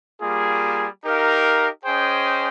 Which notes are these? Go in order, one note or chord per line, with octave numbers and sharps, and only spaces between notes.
G3 A#3 F4 G#4
D#4 G4 A#4 F5
C#4 G#4 C5 D#5 G5